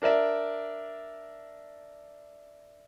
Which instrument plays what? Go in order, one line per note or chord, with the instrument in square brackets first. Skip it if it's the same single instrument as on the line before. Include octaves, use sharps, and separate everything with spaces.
[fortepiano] D4 A#4 D5 E5